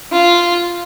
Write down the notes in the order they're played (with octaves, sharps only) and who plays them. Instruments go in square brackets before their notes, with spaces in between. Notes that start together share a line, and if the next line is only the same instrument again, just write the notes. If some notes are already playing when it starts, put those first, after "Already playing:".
[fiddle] F4